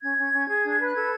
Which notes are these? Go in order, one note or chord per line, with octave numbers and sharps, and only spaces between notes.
C#4 G#6
C#4
C#4
G#4
D4
B4
F#6
A4 G#6